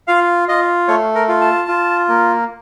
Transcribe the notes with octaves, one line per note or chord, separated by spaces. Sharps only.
F4 F5
F4 D#5
A3 C#5
A#4
F4
A5
F4
A#3